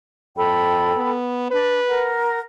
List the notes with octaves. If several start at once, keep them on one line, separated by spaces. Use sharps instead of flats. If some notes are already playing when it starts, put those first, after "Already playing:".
F2 A4 G5 B5
B3
D4 B4
A#4 F#5